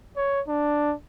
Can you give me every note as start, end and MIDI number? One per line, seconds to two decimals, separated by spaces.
0.17 0.41 73
0.48 0.94 62